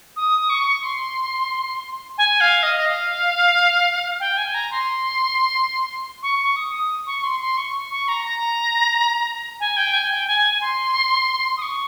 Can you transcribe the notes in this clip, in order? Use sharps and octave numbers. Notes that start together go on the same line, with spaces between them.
D#6
C#6
C6
G#5
F5
D#5
F5
G5
G#5
A#5
C6
C#6
C#6
D#6
D#6
C#6
C6
C6
C#6
C#6
A#5
A#5
G#5
G5
G#5
G5
G#5
C6
D#6
C#6